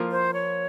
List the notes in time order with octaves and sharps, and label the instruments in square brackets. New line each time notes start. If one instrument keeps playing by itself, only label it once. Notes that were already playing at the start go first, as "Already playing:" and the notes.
Already playing: [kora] F3 A#3 F4
[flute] C5
C#5